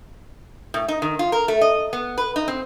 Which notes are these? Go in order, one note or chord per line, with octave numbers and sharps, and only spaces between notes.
A2
D#4
D#3
F4
A#4
A3
D#5
B3
B4
D#4
C4